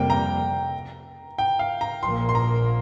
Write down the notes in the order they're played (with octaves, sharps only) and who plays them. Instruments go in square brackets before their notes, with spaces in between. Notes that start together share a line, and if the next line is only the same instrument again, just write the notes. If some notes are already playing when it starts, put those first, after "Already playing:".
Already playing: [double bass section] F2 C3 G3 A#3 [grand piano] G5
[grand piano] A#5
G5
F5
A#5
[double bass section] A#1 A#2 F3 A#3 [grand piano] C6
[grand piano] C6
A#5